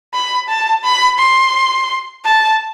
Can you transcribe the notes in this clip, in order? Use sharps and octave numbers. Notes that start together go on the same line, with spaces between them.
B5
A5
B5
C6
A5